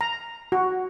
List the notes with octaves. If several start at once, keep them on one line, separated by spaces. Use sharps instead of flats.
A#5
F#4